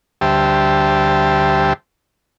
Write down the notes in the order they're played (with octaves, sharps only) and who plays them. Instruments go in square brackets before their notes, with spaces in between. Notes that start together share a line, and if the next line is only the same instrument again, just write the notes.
[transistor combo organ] D2 G3 G4 C5 E5 A5